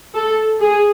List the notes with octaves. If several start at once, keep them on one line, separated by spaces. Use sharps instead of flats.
A4
G#4